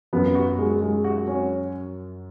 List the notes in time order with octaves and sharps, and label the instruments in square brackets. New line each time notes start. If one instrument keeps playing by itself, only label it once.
[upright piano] F#2 [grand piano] B3
[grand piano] F#4
G#3
G#3
F#4
C#4